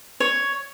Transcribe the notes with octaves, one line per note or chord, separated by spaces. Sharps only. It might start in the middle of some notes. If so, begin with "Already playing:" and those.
C#5